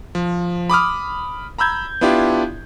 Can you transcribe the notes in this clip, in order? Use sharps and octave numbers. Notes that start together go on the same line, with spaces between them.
F3
B5 D6 D#6 F6
A#5 B5 E6 G6 G#6
B3 D4 E4 F4 G4